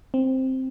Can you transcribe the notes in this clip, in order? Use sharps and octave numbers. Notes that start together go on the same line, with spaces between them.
C4